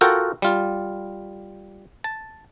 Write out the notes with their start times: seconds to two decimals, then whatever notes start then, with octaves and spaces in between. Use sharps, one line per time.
0.01 F4 F#4 A4 A#4 F#5 G5
0.42 G3 F4
2.04 A5